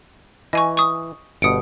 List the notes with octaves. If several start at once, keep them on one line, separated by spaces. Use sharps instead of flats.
E3 D#5 G#5 C#6
C#6 D#6
G1 B2 D#6 C#7 D7